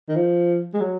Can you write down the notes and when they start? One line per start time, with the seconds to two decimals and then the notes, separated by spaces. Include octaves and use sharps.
0.09 D#3
0.16 F3
0.74 G#3
0.80 F#3